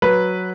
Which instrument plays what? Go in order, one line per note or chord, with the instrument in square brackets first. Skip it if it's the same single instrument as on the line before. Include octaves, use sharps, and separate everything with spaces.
[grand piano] F#3 B4